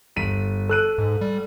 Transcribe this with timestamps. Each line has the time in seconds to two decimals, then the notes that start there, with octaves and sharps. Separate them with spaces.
0.16 G1 B6 D#7
0.69 A4 E6 F#6 D#7
0.98 G#2
1.21 G3